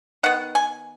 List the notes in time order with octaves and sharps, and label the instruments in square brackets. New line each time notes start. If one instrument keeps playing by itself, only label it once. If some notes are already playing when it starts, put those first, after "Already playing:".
[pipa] D#3 B3 F#5
G#5